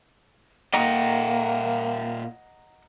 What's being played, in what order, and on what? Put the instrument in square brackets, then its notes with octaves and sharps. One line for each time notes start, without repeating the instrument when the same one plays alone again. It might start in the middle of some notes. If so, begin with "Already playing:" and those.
[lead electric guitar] A#2 G5 [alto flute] A#3 [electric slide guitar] D#5 F#5 A#5